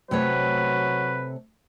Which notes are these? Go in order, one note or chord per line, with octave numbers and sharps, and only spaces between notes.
C3 F#3 A3 B4 C#5